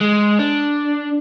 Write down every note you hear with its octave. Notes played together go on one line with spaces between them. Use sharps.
G#3
D4